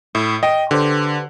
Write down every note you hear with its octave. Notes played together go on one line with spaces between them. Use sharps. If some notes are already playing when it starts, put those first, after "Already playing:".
A2 E4
D#5 G5
D3 G4 B4 C5